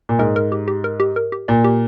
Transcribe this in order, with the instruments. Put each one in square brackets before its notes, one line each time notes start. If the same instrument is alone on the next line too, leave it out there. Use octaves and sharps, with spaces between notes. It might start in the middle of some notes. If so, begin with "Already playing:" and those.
[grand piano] A#2
[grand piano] G#2 [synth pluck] A#4
[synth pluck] A#4
G4
G4
A#4
G4
A#4
G4
[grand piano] A#2 [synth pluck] D5
[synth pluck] G4